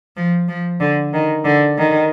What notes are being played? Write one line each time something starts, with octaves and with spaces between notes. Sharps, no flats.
F3
F3
D3
D#3
D3
D#3